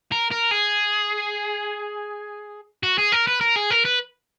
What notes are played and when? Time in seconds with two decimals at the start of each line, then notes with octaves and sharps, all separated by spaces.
0.12 A#4
0.31 A#4
0.51 G#4
2.83 F#4
2.98 G#4
3.12 A#4
3.27 B4
3.41 A#4
3.56 G#4
3.70 A#4
3.85 B4